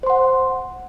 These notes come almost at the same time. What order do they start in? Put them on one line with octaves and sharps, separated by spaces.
C5 C6 F#5